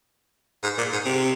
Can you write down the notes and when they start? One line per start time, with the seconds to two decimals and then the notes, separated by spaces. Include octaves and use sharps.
0.63 G#2
0.78 A#2
0.92 G#2
1.05 C3